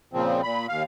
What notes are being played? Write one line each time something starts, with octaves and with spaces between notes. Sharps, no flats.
A#2 C#3 F3 C4
A#2 B5
D#2 F5